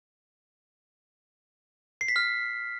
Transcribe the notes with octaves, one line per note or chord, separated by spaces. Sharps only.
C7
B6
F6